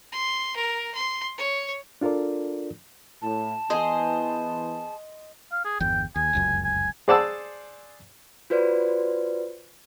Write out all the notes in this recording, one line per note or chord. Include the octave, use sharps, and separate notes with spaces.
C6
A#4
C6
C#5
D4 F4 A4 A#4 D5
A2 A5
E3 B3 G#4 C5 D#5 C6
F5
G#4
G1 E2 G5
D#2 G#5
F1 C#2 F#2
G#5
G#4 C5 D5 F#5 A5 E6
F4 F#4 B4 C5 D5